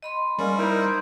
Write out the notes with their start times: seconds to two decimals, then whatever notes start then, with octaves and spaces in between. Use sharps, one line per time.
0.03 D#5 B5 C6
0.39 G3 G#3 A#3 C#4
0.59 D#4 E4 A#4 C5